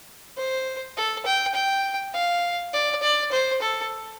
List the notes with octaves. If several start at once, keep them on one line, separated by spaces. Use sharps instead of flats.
C5
A4
G5
G5
F5
D5
D5
C5
A4